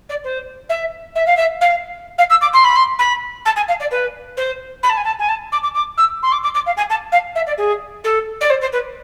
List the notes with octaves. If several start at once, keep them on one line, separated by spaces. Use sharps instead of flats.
D5
C5
E5
E5
F5
E5
F5
F5
E6
D6
C6
B5
C6
B5
A5
G#5
F5
D5
B4
C5
B5
A5
G#5
A5
G#5
A5
D6
D6
D6
E6
C6
D6
D6
D6
F5
G#5
A5
F5
E5
D5
G#4
A4
D5
C5
C5
B4